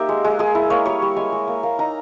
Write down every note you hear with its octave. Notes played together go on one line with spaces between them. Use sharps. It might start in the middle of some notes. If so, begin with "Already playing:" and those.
Already playing: A#3 D#4 G4 E5
G#3
G#3
G#3 G#4
E4
A#3 C#5
G3 C#5
G3
G#3 G#5
G#3
A#3
A#3
D#4 A#5